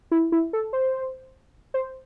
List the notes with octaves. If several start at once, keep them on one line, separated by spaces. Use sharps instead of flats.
E4
E4
A4
C5
C5